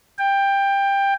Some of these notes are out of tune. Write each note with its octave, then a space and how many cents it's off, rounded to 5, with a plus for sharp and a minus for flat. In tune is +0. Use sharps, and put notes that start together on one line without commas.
G5 +15